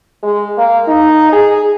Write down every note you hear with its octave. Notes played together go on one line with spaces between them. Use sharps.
G#3
A#3
D#4
G#4